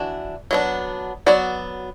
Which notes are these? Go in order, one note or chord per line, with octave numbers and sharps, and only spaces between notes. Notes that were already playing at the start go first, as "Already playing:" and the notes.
Already playing: E3 D4 F#4
F#3 B3 D4
F#3 B3 F#4 D5